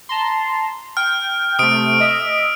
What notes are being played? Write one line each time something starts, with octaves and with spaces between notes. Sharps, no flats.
A5 A#5 C6
G5 F6
C3 A3 D#6 D7
D#5 E5